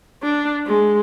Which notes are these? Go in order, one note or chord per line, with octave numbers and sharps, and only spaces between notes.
D4
G#3